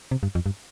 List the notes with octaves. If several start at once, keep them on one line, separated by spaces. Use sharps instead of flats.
C3
G2
F2
G2